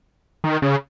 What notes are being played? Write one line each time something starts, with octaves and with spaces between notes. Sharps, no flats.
D#3
C#3